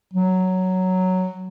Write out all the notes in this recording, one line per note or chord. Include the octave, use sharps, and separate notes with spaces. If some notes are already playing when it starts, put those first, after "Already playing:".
F#3